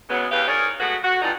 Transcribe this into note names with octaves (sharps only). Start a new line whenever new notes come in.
C#3 F#3 G#3 B3
E2 C#3 G4 B4 F5
D#4 G#4 A#4 C#5 D5
G#3 A3 B3 F#4
F#4
G2 E3 D#4 F4 D5